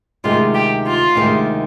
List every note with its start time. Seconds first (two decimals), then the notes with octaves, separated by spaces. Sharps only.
0.24 D2 C3 D#3 G#3 F4
0.54 G4
0.85 F4
1.15 D2 C3 D#3 G#3